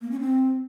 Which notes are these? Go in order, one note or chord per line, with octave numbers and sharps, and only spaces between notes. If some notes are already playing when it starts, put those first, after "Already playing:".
A#3
C#4
C4